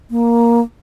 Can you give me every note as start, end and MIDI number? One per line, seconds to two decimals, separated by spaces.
0.11 0.61 58